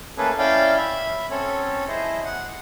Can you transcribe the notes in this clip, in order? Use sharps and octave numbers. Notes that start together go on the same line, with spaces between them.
A3 A#3 C#4 G#4 A4 B4
C#4 E4 D5 F5 G5
E5 B5
C4 C#4 A4 C#5
E4 G#4 C5 D#5
F#5